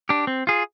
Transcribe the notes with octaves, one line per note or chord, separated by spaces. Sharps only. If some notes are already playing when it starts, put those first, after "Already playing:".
D4 G4
C4
F4 G#4